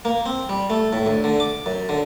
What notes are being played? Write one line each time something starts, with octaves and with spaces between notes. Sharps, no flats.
A#3
C4
G3
A3
A2
D2
D3
D6
F#2
D3